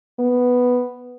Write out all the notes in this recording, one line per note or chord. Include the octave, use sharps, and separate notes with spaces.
B3